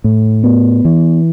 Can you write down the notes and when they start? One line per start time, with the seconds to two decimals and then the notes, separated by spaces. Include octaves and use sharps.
0.04 A2
0.43 B3
0.85 E3